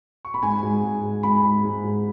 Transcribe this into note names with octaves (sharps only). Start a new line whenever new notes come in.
C#6
B5
G#2 G#5
G#3
G#2
G#3
G#2 B5
G#3
G#2
G#3